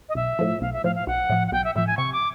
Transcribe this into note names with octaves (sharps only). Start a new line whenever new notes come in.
D#5
B1 E5
A2 F3
B1 F5
E5
A2 F3 F5
F5
B1 F#5
A2 F3
F#5
B1 G5
E5
A2 F3 E5
G#5
C3 C#6
D6